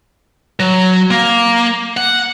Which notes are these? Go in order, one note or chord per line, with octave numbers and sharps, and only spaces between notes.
F#3
A#3
F#5